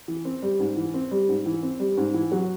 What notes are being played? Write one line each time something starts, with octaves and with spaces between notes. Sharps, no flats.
E3
C4
G3
G#2
E3
C4
G3
G#2
E3
C4
G3
G#2
E3
F#3